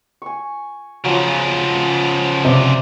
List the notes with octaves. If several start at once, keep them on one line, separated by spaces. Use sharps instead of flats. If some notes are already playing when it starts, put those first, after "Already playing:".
G#5 C#6
C#3 F3 F#3 C#4 F4
C3 D5 A#5